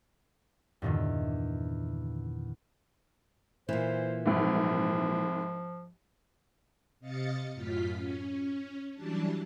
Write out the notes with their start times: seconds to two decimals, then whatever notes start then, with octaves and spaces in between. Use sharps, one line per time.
0.82 E2 G2 A#2 D3 D#3
3.69 A#2 E3 C5
4.26 C2 G#2 F3
7.00 C3 D#5 F5 A6 C#7
7.54 F#2 A2 F4 F6 B6
7.93 C#4
8.94 E3 F#3 G3 D4 A5